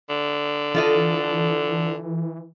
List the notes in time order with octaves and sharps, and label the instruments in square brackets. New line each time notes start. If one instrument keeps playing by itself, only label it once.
[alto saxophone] D3
[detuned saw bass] E3 [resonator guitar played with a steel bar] F4 A4 D#5